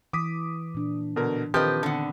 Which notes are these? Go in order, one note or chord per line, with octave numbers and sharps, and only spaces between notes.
E3 D6 D#6 B6
A#2 D4
B2 D3 A#4
D#3 F3 C4 G4 A#4 B4 D#5
D3 B3 A5 C#7